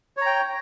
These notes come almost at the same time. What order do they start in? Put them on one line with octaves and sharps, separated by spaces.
C#5 A#5 G5